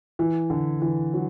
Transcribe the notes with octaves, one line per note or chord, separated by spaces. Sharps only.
E3
D3
E3
F#3